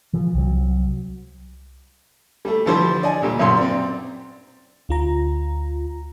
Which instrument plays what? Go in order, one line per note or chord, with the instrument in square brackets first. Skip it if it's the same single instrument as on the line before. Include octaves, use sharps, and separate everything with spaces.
[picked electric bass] E3 F3
C2 F#3
[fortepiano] G3 A3
D2 E3 F3 G3 C5
D5 D#5 G#5
D2 A#2 G3
B1 F#2 A#2 C6
C4 D5
[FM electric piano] D2 F4 A#5